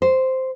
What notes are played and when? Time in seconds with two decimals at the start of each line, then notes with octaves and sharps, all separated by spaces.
0.02 C5